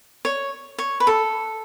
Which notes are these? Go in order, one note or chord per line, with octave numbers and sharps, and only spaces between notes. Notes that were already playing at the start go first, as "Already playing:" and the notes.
C#5
C#5
B4
A4